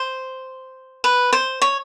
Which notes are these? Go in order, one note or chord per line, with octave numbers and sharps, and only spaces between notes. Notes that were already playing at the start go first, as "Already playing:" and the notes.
Already playing: C5
B4
C5
C#5